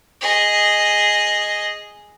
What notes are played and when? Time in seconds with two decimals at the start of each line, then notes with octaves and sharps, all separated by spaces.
0.21 G#4 D#5